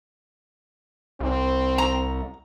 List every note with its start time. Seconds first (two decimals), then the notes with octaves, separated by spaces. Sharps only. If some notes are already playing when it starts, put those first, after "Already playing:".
1.20 C2 C4
1.78 A#5